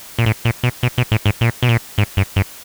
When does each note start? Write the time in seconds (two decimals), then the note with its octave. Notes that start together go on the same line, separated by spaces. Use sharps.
0.19 A#2
0.26 A2
0.45 A#2
0.64 B2
0.83 B2
0.98 B2
1.12 A2
1.26 G#2
1.41 A#2
1.63 B2
1.69 A#2
1.98 G#2
2.17 G2
2.36 G2